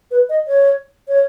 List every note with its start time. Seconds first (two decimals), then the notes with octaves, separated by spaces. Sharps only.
0.11 B4
0.29 D#5
0.48 C#5
1.08 C#5